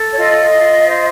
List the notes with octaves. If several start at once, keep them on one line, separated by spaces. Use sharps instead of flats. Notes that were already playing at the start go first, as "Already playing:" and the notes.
Already playing: A4
C#5
F4 D#5
F4
C5